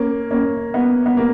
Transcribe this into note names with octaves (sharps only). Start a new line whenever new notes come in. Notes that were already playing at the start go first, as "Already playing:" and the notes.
Already playing: A#3 C#4
A#3 C#4
B3
B3
A#3